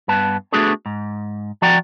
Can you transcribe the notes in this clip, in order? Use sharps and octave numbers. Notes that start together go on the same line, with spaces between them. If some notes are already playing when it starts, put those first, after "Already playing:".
G2 B3 B4 A5
A3 B3 D4 F#4 G#4 A4
G#2
F3 F#4 D5 F#5 G5 A#5